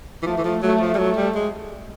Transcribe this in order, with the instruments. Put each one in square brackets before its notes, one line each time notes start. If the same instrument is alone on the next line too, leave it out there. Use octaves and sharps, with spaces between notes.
[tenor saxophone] E3
[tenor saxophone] F3 [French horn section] A3
[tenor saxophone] E3
F3
[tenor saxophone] F#3 [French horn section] A3
[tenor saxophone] F3
G3
[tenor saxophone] F#3 [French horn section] A3
[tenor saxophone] G3
G#3